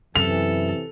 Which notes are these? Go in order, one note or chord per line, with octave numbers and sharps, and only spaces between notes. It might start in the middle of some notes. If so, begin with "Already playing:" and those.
F#2 C3 E3 A4 F7